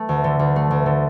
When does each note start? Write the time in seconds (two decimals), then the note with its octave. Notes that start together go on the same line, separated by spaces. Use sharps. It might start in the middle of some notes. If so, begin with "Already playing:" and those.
Already playing: A3
0.09 D2
0.24 D3
0.39 D2
0.56 A3
0.71 D2
0.86 D3